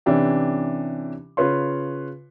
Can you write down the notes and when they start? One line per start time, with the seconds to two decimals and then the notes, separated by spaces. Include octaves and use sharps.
0.06 C3 E3 C#4 D4 E4 G4
1.37 C#3 F4 B4 C#5 C6